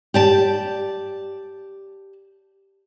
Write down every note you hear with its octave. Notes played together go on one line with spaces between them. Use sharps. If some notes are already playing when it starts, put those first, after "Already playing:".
G4 D5 A5